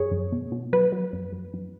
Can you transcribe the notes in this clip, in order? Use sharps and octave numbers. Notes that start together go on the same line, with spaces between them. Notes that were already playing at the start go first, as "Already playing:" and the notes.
Already playing: F#2 G#4 C#5
F#2
B2
B2
F#3 B4
F#3
F#2
F#2
F#2